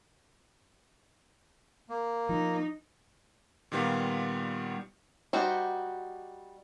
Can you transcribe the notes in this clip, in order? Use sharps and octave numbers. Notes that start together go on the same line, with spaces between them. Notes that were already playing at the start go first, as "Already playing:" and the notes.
A#3
F3 D#4
A#2 D#3 G3 B3 F4
G3 D#4 F#4 C5